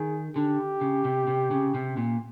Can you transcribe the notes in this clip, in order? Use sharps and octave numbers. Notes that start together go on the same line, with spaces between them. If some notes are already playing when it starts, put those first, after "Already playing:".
Already playing: D#3 G#4
D3 G4
C#3
C3
C3
C#3
C3
A#2